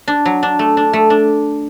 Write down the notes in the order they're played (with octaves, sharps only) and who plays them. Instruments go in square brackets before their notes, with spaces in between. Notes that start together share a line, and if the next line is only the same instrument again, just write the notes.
[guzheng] D4
F#3
D4
A3
D4
A3
D4